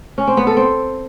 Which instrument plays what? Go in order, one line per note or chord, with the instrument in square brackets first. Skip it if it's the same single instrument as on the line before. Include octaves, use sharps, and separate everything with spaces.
[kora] C#4
C4
B3
A4
C4